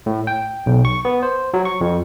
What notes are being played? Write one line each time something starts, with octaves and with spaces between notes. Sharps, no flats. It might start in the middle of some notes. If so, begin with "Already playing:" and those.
A2
G5
B1
C#6
B3
C5
F#3
C#6
F2